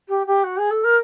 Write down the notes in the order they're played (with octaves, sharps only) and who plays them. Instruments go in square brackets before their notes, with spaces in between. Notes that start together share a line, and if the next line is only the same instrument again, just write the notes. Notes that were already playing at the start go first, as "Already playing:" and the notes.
[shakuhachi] G4
G4
F#4
G#4
A4
A#4